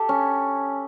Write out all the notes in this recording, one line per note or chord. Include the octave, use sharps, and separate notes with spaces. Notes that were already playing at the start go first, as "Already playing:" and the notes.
Already playing: G4 A4
C#4